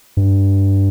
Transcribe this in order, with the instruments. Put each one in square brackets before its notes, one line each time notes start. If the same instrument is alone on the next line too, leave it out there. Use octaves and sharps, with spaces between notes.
[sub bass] G2